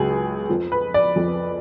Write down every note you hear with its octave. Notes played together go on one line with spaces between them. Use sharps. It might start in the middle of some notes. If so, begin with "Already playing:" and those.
Already playing: C#2 C#3 F#3 G#4
F2 F3
B4
D5
F2 F3